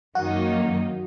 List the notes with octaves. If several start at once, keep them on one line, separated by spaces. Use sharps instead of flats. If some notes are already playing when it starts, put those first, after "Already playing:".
F#2 D#3 F#3 A#3 D#4 F#4